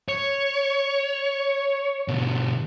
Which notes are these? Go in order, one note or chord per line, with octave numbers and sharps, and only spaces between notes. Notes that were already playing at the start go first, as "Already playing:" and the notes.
C#5
B2 D3